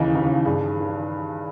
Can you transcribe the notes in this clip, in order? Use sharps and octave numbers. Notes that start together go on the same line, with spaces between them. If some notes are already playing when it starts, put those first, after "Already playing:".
Already playing: D#2 C#3 E3 D#4
D#2 C#3 E3
G2 D#3 G#4
D#3